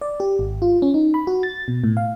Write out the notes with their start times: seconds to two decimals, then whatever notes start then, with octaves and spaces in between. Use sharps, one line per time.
0.01 D5
0.20 G4
0.39 G#1
0.62 F4
0.82 C#4
0.94 D#4
1.14 B5
1.27 F#4
1.43 A6
1.68 B2
1.84 A2
1.97 F5